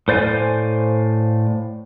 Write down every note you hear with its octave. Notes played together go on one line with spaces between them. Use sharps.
A2 C5 D5 F5 G#5